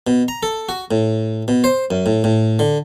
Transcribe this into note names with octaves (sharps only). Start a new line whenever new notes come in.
B2
A#5
A4
F#4
A2
B2
C5
F#2
A2
A2
D3